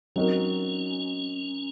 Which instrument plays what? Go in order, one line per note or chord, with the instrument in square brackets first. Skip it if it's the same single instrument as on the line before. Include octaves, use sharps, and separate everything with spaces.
[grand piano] F#3 C4 D#4 F#4 A#4 [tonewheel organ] C#4